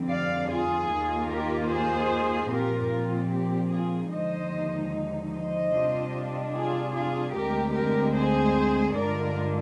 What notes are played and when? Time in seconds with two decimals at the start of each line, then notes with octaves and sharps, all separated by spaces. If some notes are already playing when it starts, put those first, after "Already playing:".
Already playing: F2 D3 G3 C4
0.09 D5 F5
0.50 F4 G#4
0.89 D#2 D#3 A#3 F4
1.30 G4 A#4
1.71 G#4 C5
2.51 A#2 F3 C4 F4 G4 A#4
2.91 F4
3.32 G4
3.73 F4 G#4
4.12 D#2 D3 F3 G#3 D#4 C5 D#5
5.33 C5 D#5
5.74 C3 G3 D4 F4
6.55 F4 G#4
6.95 F4 G#4
7.34 D2 D3 G#3 C4 G4 A#4
7.75 G4 A#4
8.16 G#4 C5
8.96 G2 D3 G#3 D4 F4 A#4 D5